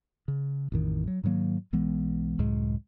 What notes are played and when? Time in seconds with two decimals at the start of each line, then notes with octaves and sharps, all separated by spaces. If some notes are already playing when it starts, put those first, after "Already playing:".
0.28 C#3
0.72 A1 F2 D#3
1.08 F#3
1.23 G#2 D#3 F#3 A#3
1.73 B1 E3 G#3 B3
2.39 C#2 F#2 A2 G#3